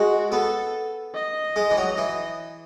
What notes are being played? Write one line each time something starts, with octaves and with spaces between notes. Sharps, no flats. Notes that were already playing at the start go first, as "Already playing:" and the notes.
Already playing: G#3 F#4
B3 A4
D#5
G#3
E3
F#3
E3